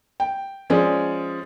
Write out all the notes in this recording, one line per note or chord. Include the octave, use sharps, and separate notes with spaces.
G5
F3 G#3 C#4 G#4 D5